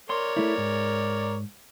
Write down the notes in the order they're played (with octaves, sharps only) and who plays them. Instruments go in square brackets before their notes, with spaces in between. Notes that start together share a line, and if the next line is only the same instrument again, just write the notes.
[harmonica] A#4 C#5 D5 [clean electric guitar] C6
[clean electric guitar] A3 E4
G#2